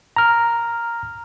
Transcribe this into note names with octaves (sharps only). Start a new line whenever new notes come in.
A#5 F6